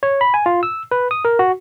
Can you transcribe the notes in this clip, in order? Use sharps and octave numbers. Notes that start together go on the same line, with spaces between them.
C#5
B5
G#5
F4
E6
B4
D#6
A#4
F#4